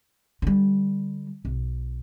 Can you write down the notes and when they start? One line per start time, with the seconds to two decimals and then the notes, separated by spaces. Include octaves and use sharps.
0.42 D3 G3
1.45 B1